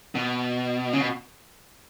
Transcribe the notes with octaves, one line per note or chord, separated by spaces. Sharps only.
B2
C#3
B2